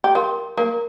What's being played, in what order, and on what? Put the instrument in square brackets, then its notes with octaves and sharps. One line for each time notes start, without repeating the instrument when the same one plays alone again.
[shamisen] G4
[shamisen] F4 [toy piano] A#4
[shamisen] A#3 [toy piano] A#4